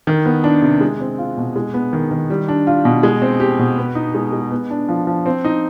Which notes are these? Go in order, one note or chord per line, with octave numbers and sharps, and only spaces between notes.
D#3
B3
D4
C3
G#3
C4
F4
B2
G#3
B3
D#3
D#3
G3
D4
F4
B2
G#3
C4
G4
B2
B3
D#4
G#3
G#3
B3
D4
F3
F3
C4
D#4